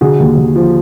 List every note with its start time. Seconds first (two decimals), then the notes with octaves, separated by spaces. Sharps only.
0.01 D3 F#4 G#4
0.20 D#2
0.37 D#2
0.56 F3